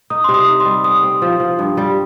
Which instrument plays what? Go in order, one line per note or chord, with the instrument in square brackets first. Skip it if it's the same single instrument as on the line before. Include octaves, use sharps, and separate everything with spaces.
[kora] D#4 [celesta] D#6
[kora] C3 [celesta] C6
[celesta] D#6
[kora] D#4
[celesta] C6
[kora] G3
[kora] C4 [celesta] D#6
[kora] C4
F3
F3
G2
G3